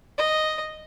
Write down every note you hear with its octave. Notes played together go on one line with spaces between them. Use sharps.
D#5